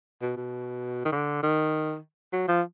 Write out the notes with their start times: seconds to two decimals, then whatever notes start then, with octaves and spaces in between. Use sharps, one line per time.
0.22 B2
0.37 B2
1.05 D#3
1.12 D3
1.43 D#3
2.33 F#3
2.48 F3